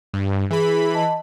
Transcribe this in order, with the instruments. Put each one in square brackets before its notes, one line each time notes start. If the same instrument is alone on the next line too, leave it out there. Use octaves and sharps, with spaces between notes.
[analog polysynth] G2
[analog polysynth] E3 B5 [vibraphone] G#4
[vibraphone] D#5 A5